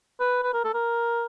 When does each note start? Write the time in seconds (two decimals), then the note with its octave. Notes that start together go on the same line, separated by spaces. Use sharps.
0.20 B4
0.43 B4
0.53 A#4
0.64 A4
0.74 A#4